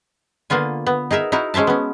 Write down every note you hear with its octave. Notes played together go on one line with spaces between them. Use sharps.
D3 A#3 B3 F4 G#5
B3
D#4 G#4 A#4 E5
D#4 E4 F#4 A#4
G#3 C#4 C5 E5 A5
B3 C#4